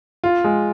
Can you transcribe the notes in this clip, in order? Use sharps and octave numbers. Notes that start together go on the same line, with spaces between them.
F4
G#3